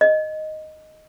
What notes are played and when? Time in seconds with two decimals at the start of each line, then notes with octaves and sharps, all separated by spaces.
0.01 D#5